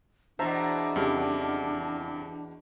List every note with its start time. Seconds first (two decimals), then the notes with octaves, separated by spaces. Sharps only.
0.39 E2 B2 D4 C5 E5 A5 A#5
0.96 F2 C#3 G3